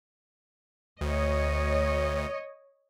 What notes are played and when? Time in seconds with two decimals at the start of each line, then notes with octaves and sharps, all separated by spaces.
1.01 D2 C#5 D#5